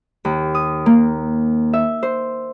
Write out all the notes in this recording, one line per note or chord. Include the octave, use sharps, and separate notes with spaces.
D#2
D#6
A#3
E5
C5